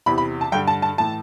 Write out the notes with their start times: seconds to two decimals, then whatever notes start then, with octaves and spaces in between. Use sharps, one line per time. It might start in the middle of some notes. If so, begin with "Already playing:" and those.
0.06 E2 C3 E3 B5
0.18 B5
0.41 A5
0.52 G2 D3 G5
0.67 A5
0.82 A5
0.98 A2 E3 A5